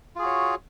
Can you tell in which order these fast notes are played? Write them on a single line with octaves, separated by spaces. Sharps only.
F4 G#4 F#4 C#5